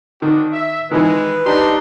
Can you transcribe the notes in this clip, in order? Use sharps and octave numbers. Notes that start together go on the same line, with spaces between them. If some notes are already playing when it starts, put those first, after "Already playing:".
D#3 C4 D4 F#4
E5
D#3 E3 G#3 B4
G3 C4 D4 D#4 G4 C6